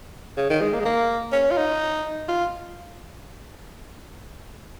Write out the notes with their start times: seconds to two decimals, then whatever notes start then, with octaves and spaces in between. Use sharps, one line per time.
0.37 C#3
0.50 D#3
0.61 G#3
0.73 A#3
0.80 G#3
0.85 A#3
1.32 C#4
1.51 F4
1.57 D#4
2.28 F4